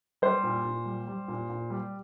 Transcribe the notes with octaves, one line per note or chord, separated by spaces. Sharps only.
G3 C5
A#2
A#2
G3
G3
A#2
A#2
G3